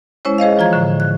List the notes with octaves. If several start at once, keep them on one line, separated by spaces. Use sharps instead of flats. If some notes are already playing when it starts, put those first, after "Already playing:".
G#3 C#4 E4 C5 C#5
G#4 C5 D#5 F5
E3 F3 F4 A#5 G#6
A2 D3 E3 F3
F#6